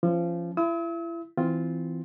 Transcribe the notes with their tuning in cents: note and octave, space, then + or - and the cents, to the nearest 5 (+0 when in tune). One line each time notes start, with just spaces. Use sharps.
F3 -25 C#4 -20
E4 +35 E6 -45
E3 +0 C4 -25 F4 +0